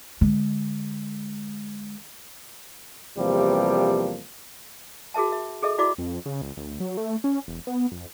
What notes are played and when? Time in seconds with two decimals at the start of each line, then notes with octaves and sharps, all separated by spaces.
0.21 D3 G#3
3.18 E2 C3 F3 G3 A#3
5.14 F#4 G#4 A#4 E5 A5
5.32 E5
5.63 G#4 A4 D#5 E5
5.78 E4 F#4 D5 E5 B5 D6
5.98 F2
6.26 C#3
6.42 C#2
6.57 D2
6.80 F#3
6.97 A3
7.24 C#4
7.48 E1
7.67 B3
7.92 F2